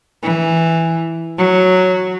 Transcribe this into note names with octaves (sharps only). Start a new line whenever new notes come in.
E3
F#3